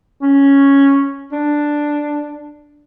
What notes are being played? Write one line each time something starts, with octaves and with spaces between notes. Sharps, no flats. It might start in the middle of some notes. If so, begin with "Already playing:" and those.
C#4
D4